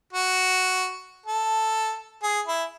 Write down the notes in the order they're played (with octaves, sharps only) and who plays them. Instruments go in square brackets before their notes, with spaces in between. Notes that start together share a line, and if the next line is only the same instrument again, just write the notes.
[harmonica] F#4
A4
G#4
E4